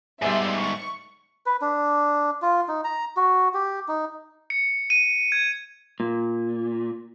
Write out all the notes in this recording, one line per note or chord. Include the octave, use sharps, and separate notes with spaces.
G#2 G3 A3 B3 G#4 D5 E5 C6
C#6
B4
D4
F4
D#4
A#5
F#4
G4
D#4
C#7
D#7
G#6
A#2